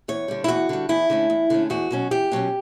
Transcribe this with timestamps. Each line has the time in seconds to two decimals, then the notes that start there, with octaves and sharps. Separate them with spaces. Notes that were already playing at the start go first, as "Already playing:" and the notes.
0.08 E2 C#5
0.28 D3 G3
0.44 E4
0.48 E2 F#4
0.69 D3 G3
0.89 E2 E4
1.10 D3 A3 C#4
1.30 E2
1.50 D3 A3 C#4
1.70 E2 F#4
1.91 B2 F#3 C#4
2.11 E2 G4
2.32 B2 F#3 C#4